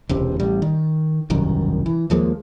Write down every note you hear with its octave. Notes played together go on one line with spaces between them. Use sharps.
E1 C#2 C3
A1 G3
D#3
E1 C2 F#2 D#3
E3
D#2 F3 G#3 A#3